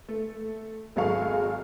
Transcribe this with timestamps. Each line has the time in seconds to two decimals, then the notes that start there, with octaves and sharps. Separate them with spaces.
0.09 A3
0.96 G#1 F#3 G#3 A4 F5 C#6